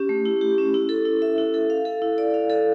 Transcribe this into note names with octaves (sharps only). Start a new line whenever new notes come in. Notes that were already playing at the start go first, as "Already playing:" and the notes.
Already playing: C#4 G4
A3
E4
G4
C#4
E4
A4
E4
E5
E4
A4
F5
A4
E4
D5
F5
A4